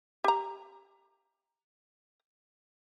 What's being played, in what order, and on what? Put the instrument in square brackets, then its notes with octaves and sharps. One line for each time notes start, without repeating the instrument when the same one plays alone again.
[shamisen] G4 A#5